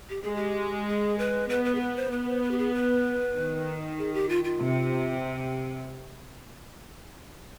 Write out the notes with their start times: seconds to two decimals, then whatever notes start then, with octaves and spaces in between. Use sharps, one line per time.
0.10 G4
0.23 G#3 G#4
0.36 G4
0.88 G#4
1.19 B4
1.49 B3 B4
1.65 B4
1.75 G#4
1.80 B4
1.97 C5
2.12 B3 B4
2.28 C5
2.43 B4
2.51 G4
2.58 G#4
2.74 B4
3.36 D#3
3.98 G#4
4.14 G4
4.29 F4
4.44 F4
4.61 C3